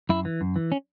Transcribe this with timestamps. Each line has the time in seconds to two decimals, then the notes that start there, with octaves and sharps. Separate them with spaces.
0.09 F#2 E4
0.25 E3
0.41 F#2
0.56 E3
0.72 C#4